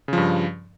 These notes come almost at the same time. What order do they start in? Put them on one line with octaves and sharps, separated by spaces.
C#3 F3 G2